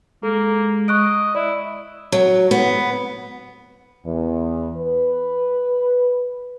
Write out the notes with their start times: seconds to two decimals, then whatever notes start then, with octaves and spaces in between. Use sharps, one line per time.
0.23 G#3 A#3 A4
0.88 D#5 C#6 F#6 D7
1.35 E4 D5
2.12 F#3
2.51 B3
4.06 E2
4.77 B4